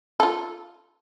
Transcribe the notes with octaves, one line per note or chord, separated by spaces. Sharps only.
F4 A4